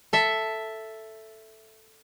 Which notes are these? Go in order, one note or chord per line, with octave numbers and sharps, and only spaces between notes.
A4 E5